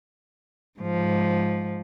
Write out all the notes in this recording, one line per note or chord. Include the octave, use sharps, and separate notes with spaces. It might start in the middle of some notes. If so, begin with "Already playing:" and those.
G#2 F3